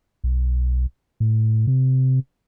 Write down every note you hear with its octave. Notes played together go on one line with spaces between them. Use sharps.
B1
A2
C3